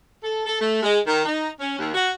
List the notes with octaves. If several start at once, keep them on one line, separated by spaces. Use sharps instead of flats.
A4
A4
A3
G#3
D#3
D#4
C#4
D#2
F#4